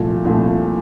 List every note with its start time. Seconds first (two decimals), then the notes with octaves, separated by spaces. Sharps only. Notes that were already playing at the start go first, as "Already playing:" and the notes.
Already playing: C2 A#2 F3 A3
0.25 C2 A#2 F3 A3